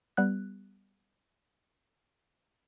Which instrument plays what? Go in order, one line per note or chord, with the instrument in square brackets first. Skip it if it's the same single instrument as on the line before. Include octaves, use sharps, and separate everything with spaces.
[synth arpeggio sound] G3 B3 F#6